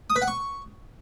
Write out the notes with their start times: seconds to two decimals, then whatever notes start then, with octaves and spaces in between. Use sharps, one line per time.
0.10 D#6
0.16 B4
0.22 F#5
0.28 C#6